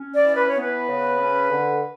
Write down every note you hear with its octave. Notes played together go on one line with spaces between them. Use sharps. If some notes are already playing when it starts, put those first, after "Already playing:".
Already playing: C#4
D5
E3
B4
C#5
B3
B4
C#3
C#4
D3